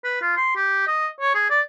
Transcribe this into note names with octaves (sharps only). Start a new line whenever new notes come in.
B4
F4
C6
G4
D#5
C#5
G#4
D5